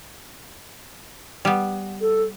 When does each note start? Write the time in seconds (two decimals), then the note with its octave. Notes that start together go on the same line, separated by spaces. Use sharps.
1.45 G3 B3
2.01 A4